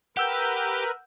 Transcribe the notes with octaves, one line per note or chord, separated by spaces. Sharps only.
G4 A#4 B4 F#5 E6 G6